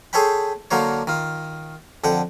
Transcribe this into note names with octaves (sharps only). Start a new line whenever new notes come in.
G#4 A4 C5 C#5 G5 B5
D3 F#3 A#3 C5 C#5
D#3 F4
F2 D3 F#5 G5